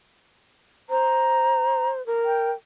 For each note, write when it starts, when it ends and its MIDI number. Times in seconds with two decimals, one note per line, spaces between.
0.90 2.04 72
0.90 1.89 82
2.06 2.51 70
2.25 2.52 79